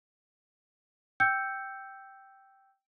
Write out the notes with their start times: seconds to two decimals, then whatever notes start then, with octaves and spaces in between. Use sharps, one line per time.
1.20 G5 E6 G6 C#7